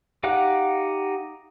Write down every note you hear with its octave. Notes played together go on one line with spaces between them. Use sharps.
D#4 G4 F5 F#5 F#6